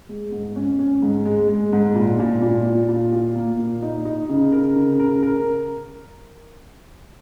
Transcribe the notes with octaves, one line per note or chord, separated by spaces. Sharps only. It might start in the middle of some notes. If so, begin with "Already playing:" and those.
G#3
G#2
C#4
C#4
G#2
G#3
G#3
G#2
A#2
A#2
A#2
F4
A#2
F4
A#3
A#2
D#4
D#4
C#3
A#4
C#3
A#4
A#4